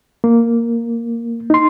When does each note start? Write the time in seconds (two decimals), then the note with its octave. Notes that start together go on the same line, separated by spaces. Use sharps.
0.24 A#3
1.50 D#4 C6